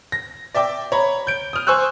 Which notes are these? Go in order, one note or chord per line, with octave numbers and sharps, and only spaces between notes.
A#6
D5 E5 G5 D6
C#5 A#5 B5
G6 D7
D#6 F6
C5 G#5 C#6 E6 F#6